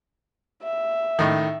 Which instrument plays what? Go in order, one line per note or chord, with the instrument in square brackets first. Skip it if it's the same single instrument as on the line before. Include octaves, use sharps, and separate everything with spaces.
[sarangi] E5
[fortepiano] A2 D#3